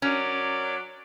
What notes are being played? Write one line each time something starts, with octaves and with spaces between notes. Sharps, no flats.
F#3 C#4 A#4 D5